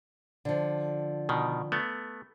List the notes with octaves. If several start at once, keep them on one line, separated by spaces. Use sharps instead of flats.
D3 F3
B2 D#3
A3 B3